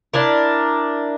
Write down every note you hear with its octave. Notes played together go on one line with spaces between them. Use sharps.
D4 E4 A#4